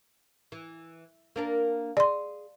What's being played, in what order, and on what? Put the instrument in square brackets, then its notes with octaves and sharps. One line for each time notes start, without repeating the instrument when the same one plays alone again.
[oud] E3
A#3 D4 A#4
[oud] G#4 [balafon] D5 C6